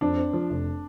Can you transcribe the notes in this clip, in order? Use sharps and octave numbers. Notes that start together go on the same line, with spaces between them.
F2 D4
C4
F3
F1